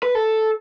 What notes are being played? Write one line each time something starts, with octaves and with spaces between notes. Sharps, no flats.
B4
A4